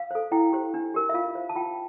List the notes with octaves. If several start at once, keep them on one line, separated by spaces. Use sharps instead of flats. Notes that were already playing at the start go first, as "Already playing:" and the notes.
Already playing: F5
A4 C5
E4 G5
G4 C5
D4
G4 A#4
E5
F4 F5
C5
A5
F4 G5